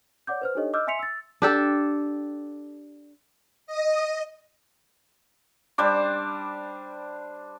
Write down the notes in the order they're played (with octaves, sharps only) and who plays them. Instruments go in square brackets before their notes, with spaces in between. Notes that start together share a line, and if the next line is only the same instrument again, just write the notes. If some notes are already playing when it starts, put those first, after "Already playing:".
[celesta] C#5 D5 F#5 D6 G6
B4 C5 F6
D4 D#4 G4 A4 C#5 D#5
D#5 D6 E6 F6 G6
E5 G#5 C6 B6 C#7 F7
E6 A6
[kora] D4 G4 A4
[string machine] D#5
[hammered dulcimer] G3 D4 C5 D6